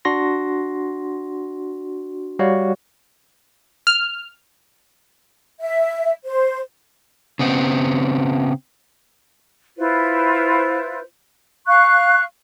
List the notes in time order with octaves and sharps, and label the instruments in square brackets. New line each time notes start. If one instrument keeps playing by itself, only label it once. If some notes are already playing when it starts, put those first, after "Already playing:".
[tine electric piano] D4 F#4 C6 A#6
G3 F#4 C#5 F5
[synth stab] F6
[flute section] E5
C5
[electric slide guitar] C#3 B3 C4
[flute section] E4 F4 B4 C5
F5 C#6 F#6